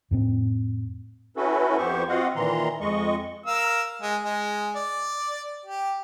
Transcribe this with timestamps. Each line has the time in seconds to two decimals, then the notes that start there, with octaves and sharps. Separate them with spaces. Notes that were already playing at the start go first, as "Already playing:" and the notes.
0.11 F2 A2 C4
1.37 C#4 E4 F#4 A4 B4
1.77 F2 B3 G4 C5 C#6
2.09 C4 F4 F#4 D#5 F5 F#5
2.36 A#2 D#3 E3 A#5 C6
2.81 F2 G#3 D#5 C#6
3.46 A#4 F5 E6
4.02 G#3
4.24 G#3
4.76 D5
5.66 G4